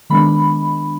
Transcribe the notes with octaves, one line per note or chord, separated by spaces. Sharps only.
D#3 G#3 B3 D4 B5